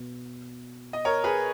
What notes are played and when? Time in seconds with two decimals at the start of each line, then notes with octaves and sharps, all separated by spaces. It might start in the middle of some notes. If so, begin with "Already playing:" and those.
Already playing: B2
0.93 D#5
1.05 A#4 C#5
1.24 G#4 B4